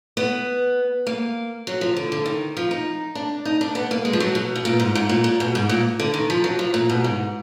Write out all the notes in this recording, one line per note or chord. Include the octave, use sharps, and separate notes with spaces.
B3
A#3
F#3
F3
D3
D3
D#3
F3
D#4
D4
D#4
D4
B3
A#3
G#3
F3
F#3
B2
B2
A#2
G#2
G#2
A#2
A#2
B2
G#2
A#2
D3
D#3
F3
F#3
F3
A#2
B2
G#2